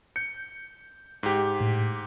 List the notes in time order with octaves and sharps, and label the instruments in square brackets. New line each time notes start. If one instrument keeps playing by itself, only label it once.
[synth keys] G6 [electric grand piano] C#7
[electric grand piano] G#2 G4
[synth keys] A2